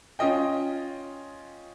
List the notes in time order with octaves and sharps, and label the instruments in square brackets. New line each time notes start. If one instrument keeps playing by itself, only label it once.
[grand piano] C#4 F4 D#5 G5